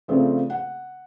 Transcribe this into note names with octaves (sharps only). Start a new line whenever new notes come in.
C#3 F3 A3 C4 D5
F#5